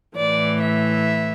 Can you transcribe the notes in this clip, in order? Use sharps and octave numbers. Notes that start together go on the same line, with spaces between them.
A2 E3 D5
E5